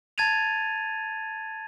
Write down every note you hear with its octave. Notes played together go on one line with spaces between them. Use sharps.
A5 G#6 A6 D#7 F7